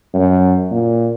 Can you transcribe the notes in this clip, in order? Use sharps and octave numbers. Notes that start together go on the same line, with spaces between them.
F#2
A#2